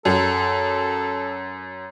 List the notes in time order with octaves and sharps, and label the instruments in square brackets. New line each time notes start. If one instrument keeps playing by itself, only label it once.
[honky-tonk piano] F#2 [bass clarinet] A4